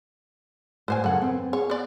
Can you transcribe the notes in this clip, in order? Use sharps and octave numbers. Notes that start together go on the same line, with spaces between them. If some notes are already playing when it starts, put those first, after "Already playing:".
A2 B4 C5 G#5
F#2 C#3 A4 F#5
C4 B4
G#4 C#5
B3 D5